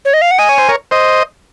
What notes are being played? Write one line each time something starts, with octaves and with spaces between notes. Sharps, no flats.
C#5
D#5
F5
F#5
D#5 G#5
C#5
C5
A#4 C#5
C5 D#5